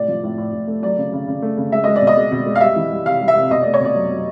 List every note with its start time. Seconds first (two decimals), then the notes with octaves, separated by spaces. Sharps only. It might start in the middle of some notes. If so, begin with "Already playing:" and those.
Already playing: A2 C3 D5
0.08 F3
0.23 A2
0.38 A2
0.53 A2
0.67 A3
0.82 F#3 D5
0.98 C#3
1.12 C#3
1.27 C#3
1.42 A3
1.57 C#3
1.72 G#3 E5
1.84 G#3 D#5
1.96 D5
2.01 B2
2.07 D#5
2.17 G#3
2.32 B2
2.46 G#3
2.56 F5
2.61 G3 E5
2.76 E3
2.91 G3
3.05 C3 F5
3.21 G3
3.28 E5
3.35 C3
3.50 B2 D#5
3.62 A3 D5
3.74 C#5
3.80 B2 D5
3.95 F#3
4.11 F#3